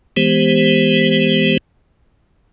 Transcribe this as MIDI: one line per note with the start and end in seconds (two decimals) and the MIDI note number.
0.17 1.57 52
0.17 1.57 56
0.17 1.57 59
0.17 1.57 67
0.17 1.57 72